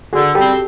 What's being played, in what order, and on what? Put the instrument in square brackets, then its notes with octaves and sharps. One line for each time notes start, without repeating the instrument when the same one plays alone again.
[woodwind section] D3 [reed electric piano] F#4 G#4
[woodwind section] G3 [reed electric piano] G4 A4
[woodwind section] C4